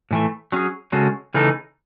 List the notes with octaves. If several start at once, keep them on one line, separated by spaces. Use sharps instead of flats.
A2 E3 A3
F#3 C#4 G#4
C#3 G#3 C#4 F#4 A4
C#3 E3 A3 D#4 A4